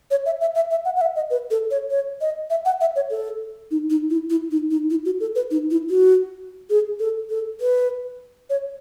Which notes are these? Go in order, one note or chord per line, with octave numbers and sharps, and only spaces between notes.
C#5
E5
E5
E5
E5
F#5
F#5
E5
D#5
B4
A4
C#5
C#5
D#5
E5
F#5
E5
C#5
A4
D#4
D#4
E4
E4
D#4
D#4
E4
F#4
A4
B4
D#4
E4
F#4
G#4
A4
A4
B4
C#5